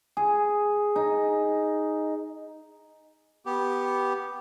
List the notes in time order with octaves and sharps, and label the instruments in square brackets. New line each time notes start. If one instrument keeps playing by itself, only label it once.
[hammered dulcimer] G#4
D#4
[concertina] B3 G4